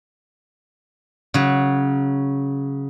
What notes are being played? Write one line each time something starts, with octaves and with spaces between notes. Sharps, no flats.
C#3 F#3